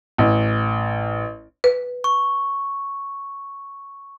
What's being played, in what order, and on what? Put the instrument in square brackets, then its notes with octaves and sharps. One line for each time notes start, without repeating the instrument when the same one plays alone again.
[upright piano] A1
[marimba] B4
[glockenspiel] C#6